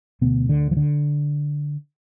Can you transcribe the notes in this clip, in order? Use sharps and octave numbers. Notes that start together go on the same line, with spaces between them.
D2 B2 D3 B3
D3
F3
D3